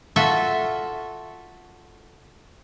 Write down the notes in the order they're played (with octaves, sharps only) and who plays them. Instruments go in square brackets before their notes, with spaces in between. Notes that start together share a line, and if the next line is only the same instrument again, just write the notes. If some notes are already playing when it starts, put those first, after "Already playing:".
[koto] F4 F#4 A4 E5